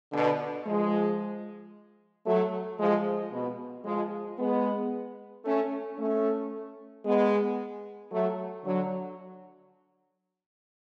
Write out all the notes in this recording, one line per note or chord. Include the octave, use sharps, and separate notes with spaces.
B2 D3
F3 G#3
F#3 A3
F3 G#3
B2
F3 G#3
G#3 B3
A3 C#4
A3 C#4
G#3 B3
F#3 A3
D3 F#3